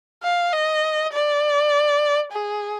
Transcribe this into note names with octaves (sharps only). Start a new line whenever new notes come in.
F5
D#5
D5
G#4